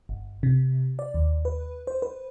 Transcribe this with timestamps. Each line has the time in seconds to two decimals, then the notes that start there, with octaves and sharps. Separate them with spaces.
0.09 G1
0.43 C3
0.99 D5
1.14 D#2
1.45 B4
1.87 C5
2.02 B4